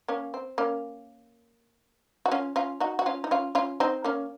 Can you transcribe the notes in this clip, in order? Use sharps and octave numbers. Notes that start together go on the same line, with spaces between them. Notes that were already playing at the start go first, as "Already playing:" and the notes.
A#3 C#4
C4
A#3 C#4
F#4
C#4 F4
C#4 F4
D#4 F#4
F#4
C#4 F4
D#4
C#4 F4
C#4 F4
C4 D#4
A#3 C#4